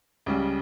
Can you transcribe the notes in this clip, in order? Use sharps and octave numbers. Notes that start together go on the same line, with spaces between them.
C#2 C#3 G3